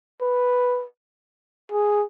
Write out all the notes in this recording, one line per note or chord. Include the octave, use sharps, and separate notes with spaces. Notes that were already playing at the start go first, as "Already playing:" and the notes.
B4
G#4